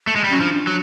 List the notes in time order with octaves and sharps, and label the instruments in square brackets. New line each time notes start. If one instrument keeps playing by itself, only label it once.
[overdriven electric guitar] A3
G#3
G3
[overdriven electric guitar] F#3 [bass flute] C#4
[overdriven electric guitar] F3 [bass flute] D4
[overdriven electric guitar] F#3